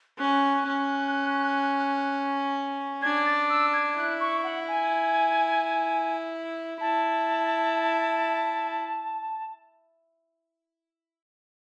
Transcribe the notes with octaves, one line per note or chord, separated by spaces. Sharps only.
C#4 F#6
C#4
D4 G#6
A6
E6
G#6
E4 F#6
C#6
F#5
G#5
E4 A5